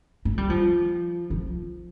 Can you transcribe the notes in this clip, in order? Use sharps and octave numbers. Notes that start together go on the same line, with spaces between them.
A#3
G3
F3
F3